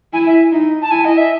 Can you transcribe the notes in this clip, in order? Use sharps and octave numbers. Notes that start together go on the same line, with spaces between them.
E4 G#5
E5
D#4
A5
E4 G#5
D#5
E5